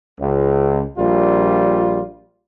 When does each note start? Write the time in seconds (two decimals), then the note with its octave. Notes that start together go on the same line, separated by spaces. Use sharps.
0.19 C#2
0.98 A#1 G3 F4